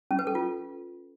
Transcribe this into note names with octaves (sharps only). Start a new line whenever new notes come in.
C#4
B4
A4
F4